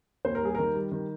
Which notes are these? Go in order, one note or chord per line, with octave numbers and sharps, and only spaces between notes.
D#2 C5
A#4
G3 G#4
D#3 A#4
G3
D#3